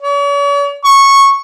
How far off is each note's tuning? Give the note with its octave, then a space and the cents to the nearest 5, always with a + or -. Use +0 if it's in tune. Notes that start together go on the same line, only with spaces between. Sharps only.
C#5 +45
C#6 -10